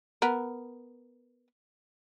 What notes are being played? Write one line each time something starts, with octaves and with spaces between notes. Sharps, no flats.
B3 A#4